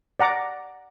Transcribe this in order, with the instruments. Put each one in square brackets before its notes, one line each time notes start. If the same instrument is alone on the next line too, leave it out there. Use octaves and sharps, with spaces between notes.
[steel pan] D5 F#5 A#5 D6